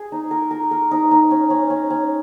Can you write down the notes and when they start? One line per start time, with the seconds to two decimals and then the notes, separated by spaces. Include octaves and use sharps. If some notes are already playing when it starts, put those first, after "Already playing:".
Already playing: G#4 D#5
0.12 D#4
0.31 A#4
0.51 A#4
0.71 A#4
0.91 D#4
1.11 D#4
1.31 C#4
1.50 C#4
1.70 C#4
1.90 C#4